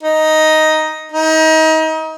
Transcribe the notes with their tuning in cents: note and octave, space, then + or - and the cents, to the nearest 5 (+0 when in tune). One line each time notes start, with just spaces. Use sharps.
D#4 +5
D#4 +30